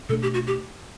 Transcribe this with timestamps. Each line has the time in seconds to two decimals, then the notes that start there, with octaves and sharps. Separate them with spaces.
0.09 B2 A3 D4 A4
0.22 G4
0.34 F#4
0.47 G4